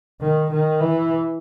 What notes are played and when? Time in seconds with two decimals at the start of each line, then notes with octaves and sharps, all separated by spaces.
0.21 D#3
0.51 D#3
0.81 E3